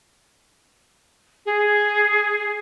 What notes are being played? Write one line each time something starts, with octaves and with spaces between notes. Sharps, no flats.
G#4